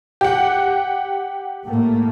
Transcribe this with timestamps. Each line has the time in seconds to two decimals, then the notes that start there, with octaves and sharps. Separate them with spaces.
0.21 G4 F#5
1.65 A2 A3 A#3